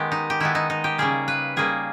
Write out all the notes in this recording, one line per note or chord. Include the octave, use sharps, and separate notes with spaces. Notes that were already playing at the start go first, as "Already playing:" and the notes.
Already playing: D#3 G#3 B3 G4
D#4
G4
D#3 G#3 B3 E4
D#4
D#4
G4
C#3 G3 A#3 G#4
B4
C#3 G3 A#3 G#4